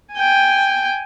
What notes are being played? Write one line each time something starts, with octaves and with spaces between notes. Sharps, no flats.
G5 G#5